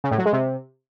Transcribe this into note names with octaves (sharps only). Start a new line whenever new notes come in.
C#3
A2
F#3
G#3
C3